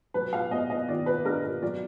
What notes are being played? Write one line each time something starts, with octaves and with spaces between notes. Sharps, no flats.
F#3 B4
F5
B3 D#5
D#5
D#3 D5
B4
D4 A#4
A#4
F#3 D5